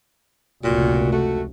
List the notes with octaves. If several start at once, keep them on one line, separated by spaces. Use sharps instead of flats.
F1 C#2 A#2 F#4
A3 F#4